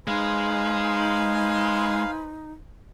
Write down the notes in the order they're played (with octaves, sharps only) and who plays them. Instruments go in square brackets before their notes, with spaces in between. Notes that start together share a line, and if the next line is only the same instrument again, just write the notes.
[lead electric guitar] G#3 [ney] D#4 [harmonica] B4 C5 G#5 [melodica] F5